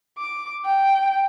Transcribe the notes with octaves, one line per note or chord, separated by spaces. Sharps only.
D6
G5